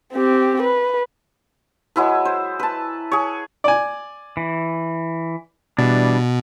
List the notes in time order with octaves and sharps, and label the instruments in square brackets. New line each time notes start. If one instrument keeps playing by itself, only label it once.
[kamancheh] C4 G4
B4
[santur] F#3 G#3 E4 B4
C5
B4 A5
G#4 C#5
[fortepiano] D5 G#5
[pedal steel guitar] E3
[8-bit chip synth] B2 [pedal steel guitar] E3 G3 D4